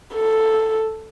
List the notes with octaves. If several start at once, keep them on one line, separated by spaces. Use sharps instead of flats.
A4